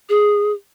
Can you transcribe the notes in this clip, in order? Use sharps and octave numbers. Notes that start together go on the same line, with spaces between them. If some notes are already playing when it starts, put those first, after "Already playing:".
G#4